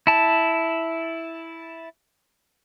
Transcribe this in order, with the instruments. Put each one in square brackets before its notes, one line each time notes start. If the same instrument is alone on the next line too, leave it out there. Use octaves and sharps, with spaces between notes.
[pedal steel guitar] E4 A5